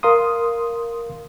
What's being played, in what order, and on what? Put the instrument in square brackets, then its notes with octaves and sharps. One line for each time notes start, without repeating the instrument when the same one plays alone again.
[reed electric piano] A#4 F5 C6 D#6